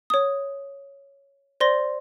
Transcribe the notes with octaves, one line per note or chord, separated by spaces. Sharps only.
C#5 D#6
C5 D5 C6 A#6